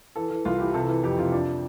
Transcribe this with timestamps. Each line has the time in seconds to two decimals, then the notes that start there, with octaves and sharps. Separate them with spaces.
0.16 E3 A4
0.30 E3
0.45 C2 F4
0.60 E3 G4
0.74 C3 A4
0.89 E3
1.04 F2 G4
1.18 C3 F4
1.32 F3 D4